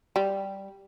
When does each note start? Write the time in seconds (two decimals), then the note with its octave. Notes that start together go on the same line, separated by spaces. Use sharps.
0.16 G3